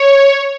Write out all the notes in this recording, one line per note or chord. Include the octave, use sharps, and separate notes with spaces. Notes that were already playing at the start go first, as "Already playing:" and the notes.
Already playing: C#5